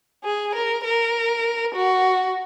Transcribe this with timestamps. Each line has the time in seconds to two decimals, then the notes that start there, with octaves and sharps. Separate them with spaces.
0.24 G#4
0.55 A#4
0.84 A#4
1.75 F#4